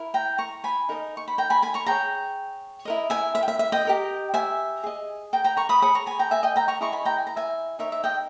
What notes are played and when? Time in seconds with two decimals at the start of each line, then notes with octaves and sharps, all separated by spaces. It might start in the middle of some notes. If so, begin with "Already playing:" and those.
Already playing: E4 A#4
0.14 G5 A#5
0.38 A#5 C#6
0.64 G#5 B5
0.89 D#4 A#4 D#5
1.17 C#6
1.28 B5
1.38 G5 A#5
1.50 G#5 B5
1.63 G#5 B5
1.74 A#5 C#6
1.86 G#4 C#5 G5 A#5
2.85 E4 A#4 D#5
3.10 E5 G#5
3.35 E5
3.43 G5
3.48 E5
3.59 E5
3.72 D#5 G5
3.85 G4 A#4 D#5
4.34 E5 G#5
4.84 G#4 D#5
5.33 G5 A#5
5.44 G5 A#5
5.57 A#5 C#6
5.69 B5 D#6
5.82 G#4 C#5 B5 D#6
5.95 A#5 C#6
6.06 G#5 B5
6.19 G5 A#5
6.31 E5 G#5
6.43 D#5 G5
6.56 G5 A#5
6.68 A#5 C#6
6.81 E4 G#4 D#5 A#5 C#6
6.92 G#5 B5
7.05 G5 A#5
7.18 G#5
7.27 A#5
7.36 E5 G#5
7.79 D#4 A#4 C#5 E5
7.92 E5
8.04 D#5 G5